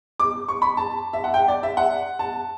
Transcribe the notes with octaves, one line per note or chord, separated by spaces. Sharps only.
D6
C#6
B5
A5
E5
F#5
G5
D5
E5
F#5
A5